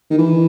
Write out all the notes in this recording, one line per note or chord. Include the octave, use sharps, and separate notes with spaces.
D#3
E3